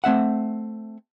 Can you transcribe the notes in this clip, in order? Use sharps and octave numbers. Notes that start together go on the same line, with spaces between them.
A3 C4 E5 F#5